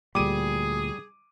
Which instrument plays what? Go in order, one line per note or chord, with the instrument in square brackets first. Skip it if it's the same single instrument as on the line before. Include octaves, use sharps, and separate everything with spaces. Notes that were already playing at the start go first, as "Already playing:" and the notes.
[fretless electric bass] D2 A#2 [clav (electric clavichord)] G3 [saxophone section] G#4 [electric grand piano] D6 D#7